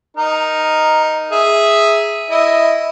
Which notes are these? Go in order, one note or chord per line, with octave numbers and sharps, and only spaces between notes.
D#4 A#4
G#4 E5
E4 D#5